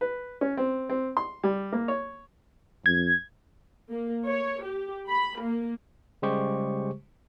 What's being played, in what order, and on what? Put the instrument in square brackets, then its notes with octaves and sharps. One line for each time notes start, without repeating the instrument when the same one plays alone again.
[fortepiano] B4
C#4
C4
C4
C6
G3
A#3
C#5
[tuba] F2 [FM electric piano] G#6
[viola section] A#3
C#5
G4
B5
A#3
[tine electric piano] C#3 G3 G#3 G4 C5 C#6